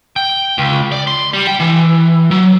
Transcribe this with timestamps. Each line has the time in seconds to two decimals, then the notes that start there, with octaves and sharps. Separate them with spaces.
0.16 G5
0.58 C#2
0.92 D5
1.07 C6
1.33 G3
1.47 G5
1.60 E3
2.31 F#3